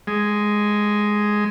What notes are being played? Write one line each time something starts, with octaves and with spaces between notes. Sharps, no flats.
G#3